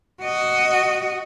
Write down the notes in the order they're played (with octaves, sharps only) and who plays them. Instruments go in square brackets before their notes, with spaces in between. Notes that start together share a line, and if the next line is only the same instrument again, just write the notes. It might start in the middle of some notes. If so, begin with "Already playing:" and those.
[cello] F#4 D#5